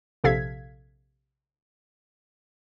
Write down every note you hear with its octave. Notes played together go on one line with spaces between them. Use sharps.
A#1 C3 A4 F5 G#6 B6